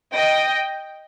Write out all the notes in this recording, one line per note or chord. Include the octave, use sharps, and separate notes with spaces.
D#5 G5